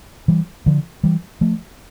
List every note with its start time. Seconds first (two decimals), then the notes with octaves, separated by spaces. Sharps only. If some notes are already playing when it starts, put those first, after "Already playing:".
0.28 E3 G3
0.66 D3 F3
1.04 E3 G3
1.41 F3 A3